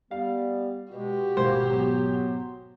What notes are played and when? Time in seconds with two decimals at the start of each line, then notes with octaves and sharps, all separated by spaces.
0.11 G3 B3 F5
0.93 B2 G#3 F#4 G4
1.37 G#1 B2 G#3 A#3 E4 C5
1.70 F#3 B3